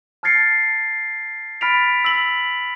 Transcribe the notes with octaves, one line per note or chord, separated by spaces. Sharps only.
A5 F6 G#6 A6 C7 C#7
B5 F6 A6 B6 D7 F7
E6 B6 F#7